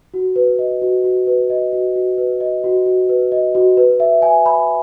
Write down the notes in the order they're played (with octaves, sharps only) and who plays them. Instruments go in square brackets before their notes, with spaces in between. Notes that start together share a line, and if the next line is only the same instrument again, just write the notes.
[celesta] F#4
B4
D#5
F#4
F#4
B4
D#5
F#4
F#4
B4
D#5
F#4
F#4
B4
D#5
F#4
B4
E5
G#5
B5